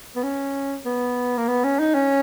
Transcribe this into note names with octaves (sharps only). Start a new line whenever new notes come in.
B3
C#4
B3
A#3
B3
C#4
D#4
C#4